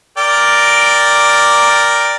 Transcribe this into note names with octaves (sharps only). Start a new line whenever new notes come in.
A#4 D5 G5